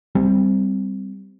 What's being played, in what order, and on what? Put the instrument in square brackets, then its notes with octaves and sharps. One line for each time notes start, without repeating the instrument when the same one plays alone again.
[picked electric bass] G3 C4